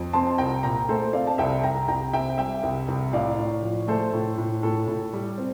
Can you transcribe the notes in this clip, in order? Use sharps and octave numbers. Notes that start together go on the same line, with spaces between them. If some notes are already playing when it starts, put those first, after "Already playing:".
Already playing: F2
C4 A5 C6
C2 G5 A#5
A#2 G5 A#5
A3 A4 C5
C4 D5 F5
A5
C2 E5 G5
C2 G5 A#5
C2 G5 A#5
C3 E5 G5
G3 E5 G5
C2
C2
A2 D5 F5
A2
F3
A3 A4 C5
A2
A2
A2 A4
A2
G3
C4